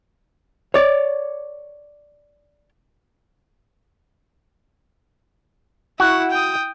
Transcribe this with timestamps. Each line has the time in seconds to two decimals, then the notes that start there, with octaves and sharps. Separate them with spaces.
0.74 C#5 D5
6.00 E4 F#4 F#5
6.31 G5 D#6